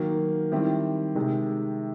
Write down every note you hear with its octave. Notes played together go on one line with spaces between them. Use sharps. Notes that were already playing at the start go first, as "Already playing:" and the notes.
Already playing: D#3 F#3 A#3
D#3 G3 C4 E4 G4
C3 D#3 G#3